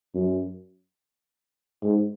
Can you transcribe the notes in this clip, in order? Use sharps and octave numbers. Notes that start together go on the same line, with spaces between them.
F#2
G#2